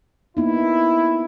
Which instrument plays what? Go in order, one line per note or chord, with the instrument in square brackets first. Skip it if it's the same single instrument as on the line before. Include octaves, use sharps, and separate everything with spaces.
[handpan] A#3 B3 D#4 [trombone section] E4